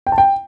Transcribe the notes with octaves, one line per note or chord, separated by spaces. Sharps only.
G5
A5
G5